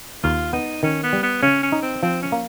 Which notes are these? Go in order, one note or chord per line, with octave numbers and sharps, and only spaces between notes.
D#2 F4
B3 D#4
D#3 C#4
B3
G3
B3
C#3 C#4
C#4
D#4
C4
F3 C4
C#4
A#3